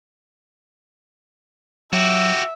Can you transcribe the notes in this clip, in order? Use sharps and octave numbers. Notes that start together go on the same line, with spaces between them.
F#3 F#4 G4 E5